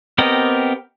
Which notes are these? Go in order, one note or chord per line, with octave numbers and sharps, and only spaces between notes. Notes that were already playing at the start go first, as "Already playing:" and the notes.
B3 C4 G4 A#4 D#5